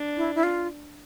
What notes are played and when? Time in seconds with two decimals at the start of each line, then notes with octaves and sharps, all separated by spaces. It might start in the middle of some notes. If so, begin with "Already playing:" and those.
Already playing: D4
0.17 E4
0.35 E4
0.43 F4